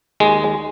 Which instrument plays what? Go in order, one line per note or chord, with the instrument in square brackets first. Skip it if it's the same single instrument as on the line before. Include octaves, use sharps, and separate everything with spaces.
[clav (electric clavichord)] D#2 G#3